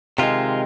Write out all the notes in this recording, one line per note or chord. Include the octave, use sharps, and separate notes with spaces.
C3 D#3 G#3 F4